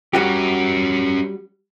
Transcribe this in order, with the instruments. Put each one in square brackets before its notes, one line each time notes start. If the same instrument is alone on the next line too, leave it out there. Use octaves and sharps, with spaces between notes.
[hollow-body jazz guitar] G3 F#4 G4 [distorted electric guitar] C#4 A#4